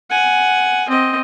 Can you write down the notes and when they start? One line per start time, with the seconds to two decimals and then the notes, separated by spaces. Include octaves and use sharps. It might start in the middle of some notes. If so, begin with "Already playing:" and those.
0.10 F#5 G#5
0.89 C4 D#5